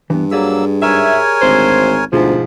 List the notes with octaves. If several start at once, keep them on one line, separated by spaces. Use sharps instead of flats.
G2 E3 B3
F#3 A#3 G4 G#4 D5 E6
G#2 A#4 C#5 E5 G#5
G#1 D2 C5
D2 G#2 B2 F3 G#4